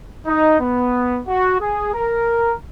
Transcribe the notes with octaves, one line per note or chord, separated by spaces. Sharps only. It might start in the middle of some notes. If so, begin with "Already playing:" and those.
D#4
B3
F#4
G#4
A#4